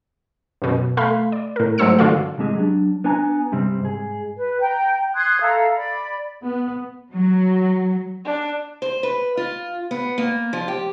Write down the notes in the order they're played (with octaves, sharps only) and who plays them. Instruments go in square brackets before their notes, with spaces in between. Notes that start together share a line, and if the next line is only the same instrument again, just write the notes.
[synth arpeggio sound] F#2 B2
A3 F5 B5 C6
D5
A2 A#4
G#2 F#3 A3 C5 E6 C#7
G1 D3 F4 F#4 A4 F5
[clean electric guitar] C2 G#2 G#3 C4 G4 G#4
F#3 D4
B3 D4 G#5 A#5
G2 C3 G3 C4
G#2 G#4
[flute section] B4
G5 A#5
C6 D#6 F#6 G#6
A4 E5 F5 A#5
D5 B5
[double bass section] B3
[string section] F#3
[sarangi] D4
[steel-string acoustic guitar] C5
B4
F4
B3
A#3
F3
G4